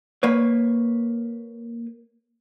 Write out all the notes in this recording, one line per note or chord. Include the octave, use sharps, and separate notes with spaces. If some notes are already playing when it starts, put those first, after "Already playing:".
A#3 B4 C#5